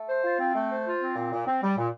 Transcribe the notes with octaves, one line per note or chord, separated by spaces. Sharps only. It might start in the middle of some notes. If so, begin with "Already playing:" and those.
Already playing: A3
C5
F4
C4
A3
C5
F4
C4
A#2
A#2
C4
G3
A#2